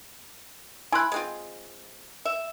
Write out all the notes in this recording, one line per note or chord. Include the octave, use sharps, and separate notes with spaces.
E4 G#5 B5 C6 F#6
G#3 C4 F4
E5